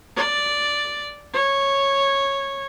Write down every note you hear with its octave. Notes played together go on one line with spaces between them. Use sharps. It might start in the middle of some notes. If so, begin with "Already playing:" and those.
D5
C#5